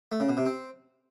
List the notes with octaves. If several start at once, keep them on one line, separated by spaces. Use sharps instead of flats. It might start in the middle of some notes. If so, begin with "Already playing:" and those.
A3
C#3
B2
C3
C4